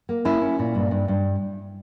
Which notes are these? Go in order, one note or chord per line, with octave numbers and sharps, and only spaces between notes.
A#3
C#4 E4
C#4
A#2
G2
G2
G2